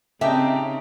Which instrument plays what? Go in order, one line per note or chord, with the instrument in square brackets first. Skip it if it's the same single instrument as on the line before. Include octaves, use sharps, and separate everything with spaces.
[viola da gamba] C#3 C4 [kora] D4 D#4 [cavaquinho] G4 [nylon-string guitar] E5